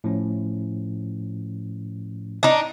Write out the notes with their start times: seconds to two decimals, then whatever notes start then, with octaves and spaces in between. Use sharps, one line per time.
0.04 A2 F3 C#4
2.43 D4 D#4